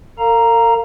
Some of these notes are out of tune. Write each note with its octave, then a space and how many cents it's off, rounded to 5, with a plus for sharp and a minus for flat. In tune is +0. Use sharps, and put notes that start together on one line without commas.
A#4 -45 F5 +0 A#5 +0